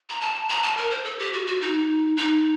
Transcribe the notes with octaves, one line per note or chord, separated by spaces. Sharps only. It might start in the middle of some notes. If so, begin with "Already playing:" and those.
A#5
A5
A#5
A5
A#4
C5
A4
G4
F#4
F#4
D#4
D#4